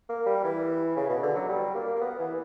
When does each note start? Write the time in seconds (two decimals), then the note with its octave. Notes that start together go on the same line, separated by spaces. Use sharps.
0.09 A#3
0.26 G3
0.44 E3
0.96 C#3
1.09 B2
1.23 D3
1.35 F#3
1.49 G3
1.75 A#3
1.96 A#3
2.01 B3
2.19 E3